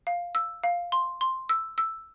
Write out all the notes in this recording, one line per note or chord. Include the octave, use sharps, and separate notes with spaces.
F5
E6
F5
C6
C6
E6
E6